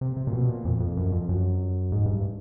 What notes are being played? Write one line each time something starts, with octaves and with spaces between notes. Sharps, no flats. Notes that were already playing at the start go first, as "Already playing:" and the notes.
C3
C3
A#2
B2
A#2
F2
F2
F#2
F2
F#2
G#2
G2